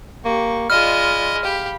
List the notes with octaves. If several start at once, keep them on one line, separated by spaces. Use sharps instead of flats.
A#3 G4 C#6
G#3 F4 D5 D#5 B5 F6
G4 F5 B5